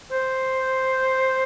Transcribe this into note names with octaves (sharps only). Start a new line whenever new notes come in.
C5